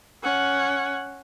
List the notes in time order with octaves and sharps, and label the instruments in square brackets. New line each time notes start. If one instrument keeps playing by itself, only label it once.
[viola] C#4 F#5